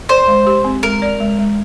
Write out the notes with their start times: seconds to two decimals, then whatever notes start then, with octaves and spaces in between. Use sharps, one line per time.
0.09 C5 D5
0.28 G#3
0.47 G4
0.64 C4
0.83 G#3 A#4
1.02 D5
1.20 G#3
1.39 G#3